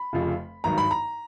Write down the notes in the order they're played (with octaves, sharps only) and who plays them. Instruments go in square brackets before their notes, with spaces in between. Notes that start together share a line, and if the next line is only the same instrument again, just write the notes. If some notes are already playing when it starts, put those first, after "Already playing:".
Already playing: [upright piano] B5
[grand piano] F1 F2 C#3 F3
[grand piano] G#1 G2 D#3 F#3 [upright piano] A#5
[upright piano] B5
A#5